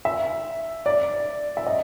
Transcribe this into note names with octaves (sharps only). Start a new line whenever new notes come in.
E5
D5
E5
D#5